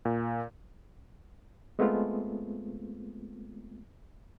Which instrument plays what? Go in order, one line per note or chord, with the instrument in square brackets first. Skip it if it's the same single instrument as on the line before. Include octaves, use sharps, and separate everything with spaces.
[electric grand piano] A#2
[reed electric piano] G#3 A3 B3 C4 F4